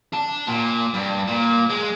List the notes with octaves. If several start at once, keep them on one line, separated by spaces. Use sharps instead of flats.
D4 A5
A#2
G2
A#2
G#3